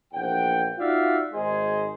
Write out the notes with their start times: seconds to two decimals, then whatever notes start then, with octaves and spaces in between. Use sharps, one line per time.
0.13 A#1 E2 F#5 G5
0.78 D#4 F4 F#4 D5 E5 F5
1.32 G#1 G#3 D#4 G#4 C5 G#5